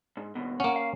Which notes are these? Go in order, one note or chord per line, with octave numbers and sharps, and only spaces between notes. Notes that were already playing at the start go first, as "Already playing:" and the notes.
G#2
D#2 B2
A#3 C#4 F#5
F5